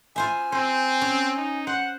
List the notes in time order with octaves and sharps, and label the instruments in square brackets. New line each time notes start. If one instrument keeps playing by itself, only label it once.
[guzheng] F4 C5 E5 [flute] G#5
[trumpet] C4 [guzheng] C5
[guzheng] C#4
[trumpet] D#4
[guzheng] C5 [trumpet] F#5